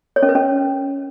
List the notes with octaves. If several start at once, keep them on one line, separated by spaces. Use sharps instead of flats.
C#5
C#4
B4
C#4